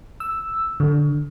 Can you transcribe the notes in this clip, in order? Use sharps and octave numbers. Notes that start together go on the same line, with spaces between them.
E6
D3